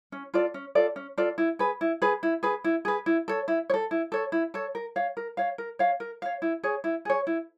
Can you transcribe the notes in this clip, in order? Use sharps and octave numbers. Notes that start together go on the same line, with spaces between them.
C#4
F4 A4 D5
C#4
F4 A4 D5
C#4
F4 A4 D5
E4
G#4 B4
E4
G#4 B4
E4
G#4 B4
E4
G#4 B4
E4
A4 C#5
E4
C#5
A4
E4
A4 C#5
E4
A4 C#5
A#4
C#5 F5
A#4
C#5 F5
A#4
C#5 F5
A#4
C#5 F5
E4
G#4 C#5
E4
G#4 C#5
E4